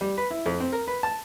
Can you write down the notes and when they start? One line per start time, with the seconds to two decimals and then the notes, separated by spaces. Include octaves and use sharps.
0.01 G3
0.18 B4
0.31 E4
0.46 F2
0.60 C4
0.72 A#4
0.87 B4
1.03 A5